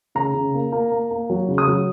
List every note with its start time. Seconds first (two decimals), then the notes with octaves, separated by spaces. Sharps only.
0.15 C#3 A#5
0.34 C#3
0.54 A#3
0.72 A#3
0.91 A#3
1.11 A#3
1.30 F#3
1.48 C#3
1.58 D#6
1.67 F#3